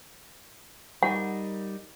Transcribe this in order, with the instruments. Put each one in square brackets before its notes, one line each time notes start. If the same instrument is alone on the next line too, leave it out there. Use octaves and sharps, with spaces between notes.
[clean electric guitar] G3 D#4 A#4 [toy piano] F#5